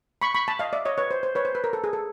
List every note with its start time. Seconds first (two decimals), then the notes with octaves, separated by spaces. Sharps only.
0.22 B5 C#6
0.35 B5 C#6
0.48 A5 B5
0.59 D#5 F5
0.73 D5 E5
0.85 C#5 D#5
0.98 B4 C#5
1.11 C5
1.23 C5
1.35 B4 C#5
1.45 C5
1.55 B4
1.64 A#4
1.73 A4
1.84 G#4
1.93 A4